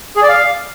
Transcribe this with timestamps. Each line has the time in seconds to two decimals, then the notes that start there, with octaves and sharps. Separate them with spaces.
0.17 G#4
0.23 D5
0.29 F5